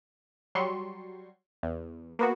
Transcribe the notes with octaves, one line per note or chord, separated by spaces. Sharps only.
F#3 G3 C6 C#6
E2
A#3 B3 F#4